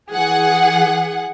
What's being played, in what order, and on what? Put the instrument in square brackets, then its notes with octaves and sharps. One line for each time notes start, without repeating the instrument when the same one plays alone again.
[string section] E3 G#4 F#5